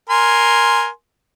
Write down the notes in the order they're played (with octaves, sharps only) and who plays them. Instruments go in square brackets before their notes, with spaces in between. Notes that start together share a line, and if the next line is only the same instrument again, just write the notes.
[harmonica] A#4 G#5 C6